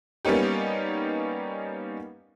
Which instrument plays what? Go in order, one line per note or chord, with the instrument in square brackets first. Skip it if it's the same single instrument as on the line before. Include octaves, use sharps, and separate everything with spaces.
[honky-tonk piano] G3 A#3 B3 C#4 D#4 G4